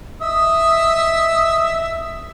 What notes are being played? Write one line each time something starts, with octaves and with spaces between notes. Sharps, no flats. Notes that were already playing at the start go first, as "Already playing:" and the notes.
D#5 E5